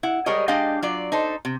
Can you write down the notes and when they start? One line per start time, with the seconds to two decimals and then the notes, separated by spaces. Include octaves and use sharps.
0.03 E4 F#5
0.26 G3 G#3 G#4 A#4 C#5 D#5
0.48 G#3 D4 G4 D#5 F5 G5
0.82 F#3 F4 D5
1.12 D#4 A4 C5
1.45 C3